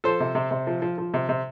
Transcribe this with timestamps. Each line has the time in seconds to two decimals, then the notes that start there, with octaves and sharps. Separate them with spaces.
0.04 F3 A4 C5
0.20 C3
0.35 C3
0.51 C3
0.67 F3
0.82 F3
0.98 F3
1.14 C3
1.29 C3